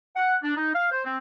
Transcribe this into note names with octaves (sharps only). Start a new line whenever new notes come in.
F#5
D4
D#4
F5
C5
C4